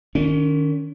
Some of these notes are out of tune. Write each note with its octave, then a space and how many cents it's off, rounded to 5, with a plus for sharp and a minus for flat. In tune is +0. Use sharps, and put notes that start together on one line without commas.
D#3 -20 C#4 +30